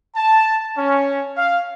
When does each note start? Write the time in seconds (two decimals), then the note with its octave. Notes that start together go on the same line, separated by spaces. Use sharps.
0.16 A5
0.77 C#4
1.36 F5